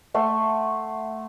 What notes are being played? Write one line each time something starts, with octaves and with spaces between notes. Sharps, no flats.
A3 F#5 C6